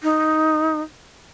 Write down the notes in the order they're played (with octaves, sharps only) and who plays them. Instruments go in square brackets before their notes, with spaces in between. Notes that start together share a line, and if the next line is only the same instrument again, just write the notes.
[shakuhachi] D#4